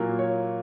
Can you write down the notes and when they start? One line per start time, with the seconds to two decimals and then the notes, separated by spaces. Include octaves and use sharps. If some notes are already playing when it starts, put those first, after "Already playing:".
Already playing: A#2 F#3 A#3
0.19 C#5